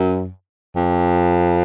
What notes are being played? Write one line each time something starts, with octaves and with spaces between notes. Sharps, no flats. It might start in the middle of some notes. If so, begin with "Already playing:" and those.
Already playing: F#2
F2